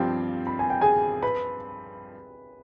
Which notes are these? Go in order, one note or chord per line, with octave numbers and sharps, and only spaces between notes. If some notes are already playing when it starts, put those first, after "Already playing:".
Already playing: G2 F3 C4 G4 F5 G5
B5
G#5
G5
G#4 G#5
B4 B5